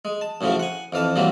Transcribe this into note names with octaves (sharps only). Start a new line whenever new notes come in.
G#3
A5
F#2 A2 C#3 F3 C#4
F#5 G#5
F2 E3 F5 A5
G2 A#2 E3 F#3 A#3 C4